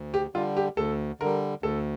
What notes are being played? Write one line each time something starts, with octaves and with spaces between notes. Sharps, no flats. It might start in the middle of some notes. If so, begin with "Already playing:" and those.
Already playing: D2
G4
D3 G3 F4
G4
D2 A4
D3 G3 A#4
D2 A4